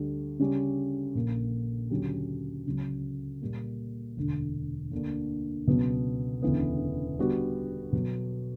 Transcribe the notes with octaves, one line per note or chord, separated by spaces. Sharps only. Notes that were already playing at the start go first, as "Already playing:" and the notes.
Already playing: D2 D3 G3
C#3 G3 C#4
A#1 A#2 A#3
D2 C#3 F#3 C#4 G4
C#2 C#3 F#3
A#2 G3 A#3
E1 D2 D3
D2 D3 A#3 D4
C#2 B2 F#3 B3
E1 D2 C#3 E3 B3
D3 G3 B3 F#4
B2 F#3 B3